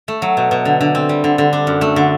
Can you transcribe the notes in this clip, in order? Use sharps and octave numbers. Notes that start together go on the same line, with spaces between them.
A3
F#3
B2
B2
D3
D3
C4
G3
D3
D3
D4
F#2
A3
D3